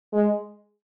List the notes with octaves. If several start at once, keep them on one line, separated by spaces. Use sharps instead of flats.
G#3